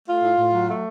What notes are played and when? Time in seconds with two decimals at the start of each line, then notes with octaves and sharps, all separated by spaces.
0.06 A3 F4
0.22 A2
0.37 A2
0.53 F#3
0.69 A3